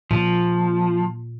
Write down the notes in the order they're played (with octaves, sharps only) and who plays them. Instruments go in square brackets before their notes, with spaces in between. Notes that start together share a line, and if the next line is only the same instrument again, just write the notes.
[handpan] A#2 [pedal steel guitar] F3